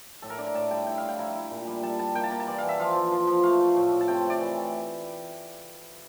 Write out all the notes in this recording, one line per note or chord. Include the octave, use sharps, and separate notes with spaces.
A2 A4
A#4
D4 D5
A#5
A2 A5
G3 G5
E4 G5
E4 F5
G5
E4 A#5
E4
A#2
G3
G3 A5
G3 A5
A#3 G5
A5
A#3 A#5
A5
E3 D5
E3 F5
E5
F3 F5
F3
F3
F3
A3 F5
A3
A2
A2
A5
C3 G5
A3
D5
E3